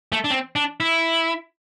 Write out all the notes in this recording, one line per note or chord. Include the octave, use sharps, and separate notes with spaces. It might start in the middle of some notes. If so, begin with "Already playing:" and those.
A3
D4
C4
D4
E4